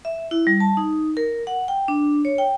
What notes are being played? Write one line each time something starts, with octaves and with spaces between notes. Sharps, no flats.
E5
E4
G3
A5
D#4
A#4
F#5
G5
D4
C#5
G5